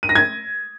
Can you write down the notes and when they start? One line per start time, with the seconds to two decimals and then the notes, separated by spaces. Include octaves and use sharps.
0.03 D#7
0.09 A#6
0.15 G#6